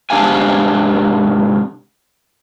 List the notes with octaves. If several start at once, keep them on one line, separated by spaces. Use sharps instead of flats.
G#2 C3 D4 G4 F5 G#5